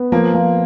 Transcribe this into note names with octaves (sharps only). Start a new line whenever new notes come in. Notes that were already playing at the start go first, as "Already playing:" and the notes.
Already playing: B3
F3 A#3
F3